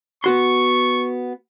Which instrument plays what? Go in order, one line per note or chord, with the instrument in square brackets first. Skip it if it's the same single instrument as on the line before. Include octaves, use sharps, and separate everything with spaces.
[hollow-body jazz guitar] B3 F#4 C6 [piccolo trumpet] C#6